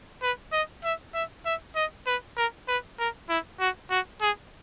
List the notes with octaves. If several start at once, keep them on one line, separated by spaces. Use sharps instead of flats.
B4
D#5
E5
E5
E5
D#5
B4
A#4
B4
A#4
E4
F#4
F#4
G#4